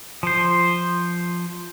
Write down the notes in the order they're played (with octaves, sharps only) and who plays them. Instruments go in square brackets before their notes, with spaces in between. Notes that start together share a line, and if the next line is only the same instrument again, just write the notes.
[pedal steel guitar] F3 C5